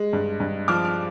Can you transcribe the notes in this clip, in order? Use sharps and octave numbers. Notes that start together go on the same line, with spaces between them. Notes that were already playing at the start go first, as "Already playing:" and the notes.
Already playing: G#3
G2
G2
F3 D6 F6
F6